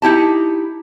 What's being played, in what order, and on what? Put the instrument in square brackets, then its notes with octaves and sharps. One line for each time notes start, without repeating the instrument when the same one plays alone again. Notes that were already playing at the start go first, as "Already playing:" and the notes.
[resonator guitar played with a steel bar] D#4 E4 G4 A5